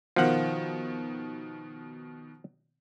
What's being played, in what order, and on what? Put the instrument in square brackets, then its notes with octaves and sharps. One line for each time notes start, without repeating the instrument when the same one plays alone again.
[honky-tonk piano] B2 D#3 [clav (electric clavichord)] F3 F#5